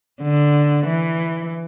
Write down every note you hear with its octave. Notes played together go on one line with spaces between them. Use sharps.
D3
E3